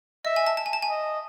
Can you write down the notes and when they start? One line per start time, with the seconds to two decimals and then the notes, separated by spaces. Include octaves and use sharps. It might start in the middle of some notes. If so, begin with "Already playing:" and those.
0.25 D#5 E5
0.36 G#5
0.47 A5
0.57 A5
0.66 G#5
0.73 A5
0.82 G#5
0.90 D#5